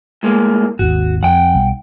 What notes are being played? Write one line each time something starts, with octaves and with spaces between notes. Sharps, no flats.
A2 G#3 A#3
G#1 D#2 F#4
F2 F#5 G5
B1 G3